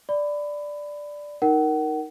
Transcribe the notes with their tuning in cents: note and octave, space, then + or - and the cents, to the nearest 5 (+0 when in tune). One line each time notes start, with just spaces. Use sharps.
D5 +0 B5 +20
D#4 +0 A#4 +0 F#5 +35